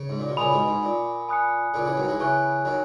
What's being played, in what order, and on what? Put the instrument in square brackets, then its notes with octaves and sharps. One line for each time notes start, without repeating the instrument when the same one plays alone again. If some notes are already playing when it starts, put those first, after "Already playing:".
Already playing: [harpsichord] C#3
G#2
A#2
B2
[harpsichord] A#2 C#3 [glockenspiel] G#5 B5 D#6
[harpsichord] G#2 B2
G#2
A#2
[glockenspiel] G#5 B5 D#6 F#6 C#7
[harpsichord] A#2 C#3
C#3 E3
D#3 F#3
E3 G#3
[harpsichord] C#3 E3 [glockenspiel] G#5 C#6 F#6
[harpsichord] D#3 F#3